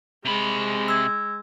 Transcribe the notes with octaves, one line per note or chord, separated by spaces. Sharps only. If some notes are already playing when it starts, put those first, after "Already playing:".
C3 G#3 B5
E6 G#6